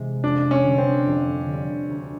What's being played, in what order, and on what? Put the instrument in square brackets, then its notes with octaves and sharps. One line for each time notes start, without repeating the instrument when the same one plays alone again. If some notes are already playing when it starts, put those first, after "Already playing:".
Already playing: [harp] C3 E3 G#3
[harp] F2 [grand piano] D4
[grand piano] C#4
[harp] D3 G3
[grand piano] C4
[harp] F2
D3 G3
D2